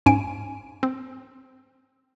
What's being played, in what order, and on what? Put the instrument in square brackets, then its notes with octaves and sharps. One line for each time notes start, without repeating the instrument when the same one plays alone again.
[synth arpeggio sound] G#2 C#4 G#5 D7
C4